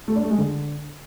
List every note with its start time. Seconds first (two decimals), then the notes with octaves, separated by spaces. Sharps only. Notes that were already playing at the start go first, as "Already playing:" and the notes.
0.08 A3
0.15 D4
0.23 A3
0.31 G#3
0.38 D3